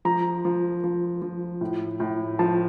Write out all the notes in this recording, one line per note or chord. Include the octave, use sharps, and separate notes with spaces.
F3 A#5
F3
F3
F3
A2
A2
F3 A5